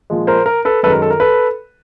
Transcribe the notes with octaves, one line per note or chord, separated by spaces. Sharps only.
A#2 F3 G#3
A#4 C5
A#4
A4 B4
F#2 D#3 G#3 A4 B4
A#4
A4
A#4
A4 B4